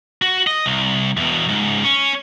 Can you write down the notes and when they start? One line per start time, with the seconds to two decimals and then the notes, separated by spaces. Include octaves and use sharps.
0.22 F#4
0.47 D#5
0.66 C2
1.17 E2 B2
1.48 C#2 G#2
1.84 C#4